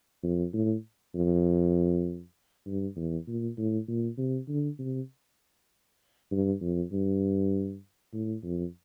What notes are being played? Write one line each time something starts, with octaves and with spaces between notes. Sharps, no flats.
F2
A2
F2
G2
E2
A#2
A2
A#2
C3
D3
C3
G2
F2
G2
A2
F2